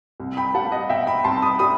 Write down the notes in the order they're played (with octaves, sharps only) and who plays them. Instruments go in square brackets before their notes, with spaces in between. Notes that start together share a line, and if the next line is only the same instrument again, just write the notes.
[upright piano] C2
G5 B5
G3 F#5 A5
D#5 F#5
B2 E5 G5
G5 B5
C2 A5 C6
B5 D#6
G3 B5 D#6